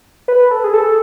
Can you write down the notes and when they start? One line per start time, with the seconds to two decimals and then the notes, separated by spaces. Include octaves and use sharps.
0.28 B4
0.51 A4
0.64 G#4
0.74 A4